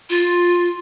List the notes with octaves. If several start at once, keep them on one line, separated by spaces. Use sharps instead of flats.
F4